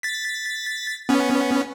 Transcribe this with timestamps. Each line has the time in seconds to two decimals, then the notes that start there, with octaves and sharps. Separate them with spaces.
0.03 A6 B6
1.09 B3 C#4